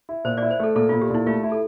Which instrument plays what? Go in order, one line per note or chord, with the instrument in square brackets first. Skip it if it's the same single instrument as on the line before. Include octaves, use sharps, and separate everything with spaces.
[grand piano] E4
[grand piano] A#2 [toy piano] C5
[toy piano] D5
[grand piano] E4
[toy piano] C5
[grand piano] A3 [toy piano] A4
[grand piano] A#2 [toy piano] A4
[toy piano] F4
[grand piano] A#2
[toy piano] G4
[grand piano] A#2 [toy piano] E4
[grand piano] A3 [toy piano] F4
[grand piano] E4
[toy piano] A4